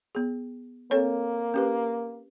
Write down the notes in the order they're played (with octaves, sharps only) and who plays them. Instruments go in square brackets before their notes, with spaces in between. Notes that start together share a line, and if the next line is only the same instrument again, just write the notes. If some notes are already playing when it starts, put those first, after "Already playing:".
[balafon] B3 G#4
[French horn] A#3 [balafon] C4 A4 C#5
[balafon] C#4 G4 B4